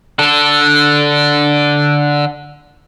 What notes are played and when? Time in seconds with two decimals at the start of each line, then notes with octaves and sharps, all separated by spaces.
0.19 D3 A4